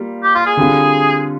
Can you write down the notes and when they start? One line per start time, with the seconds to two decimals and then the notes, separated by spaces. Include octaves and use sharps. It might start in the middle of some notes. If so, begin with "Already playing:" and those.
Already playing: G3 A#3 F4
0.23 G4
0.35 F4
0.46 G#4
0.57 D3 G3 C4 F4